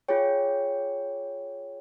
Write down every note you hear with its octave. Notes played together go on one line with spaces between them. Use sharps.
F4 G#4 C#5 G5